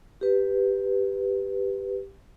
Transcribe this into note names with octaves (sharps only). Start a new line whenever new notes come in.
G4 B4